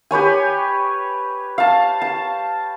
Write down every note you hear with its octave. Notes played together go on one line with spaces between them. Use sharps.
G4 B4 C#5 G#5
F5 A5
A5